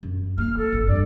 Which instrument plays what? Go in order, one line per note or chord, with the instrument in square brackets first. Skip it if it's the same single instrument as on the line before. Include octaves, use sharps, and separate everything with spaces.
[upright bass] F#2
[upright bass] A#3 [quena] F6
[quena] A4
[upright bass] G#1 F2
[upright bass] G2 [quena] D5